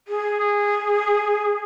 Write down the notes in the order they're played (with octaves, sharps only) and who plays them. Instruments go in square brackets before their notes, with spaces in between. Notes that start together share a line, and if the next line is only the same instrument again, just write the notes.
[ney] G#4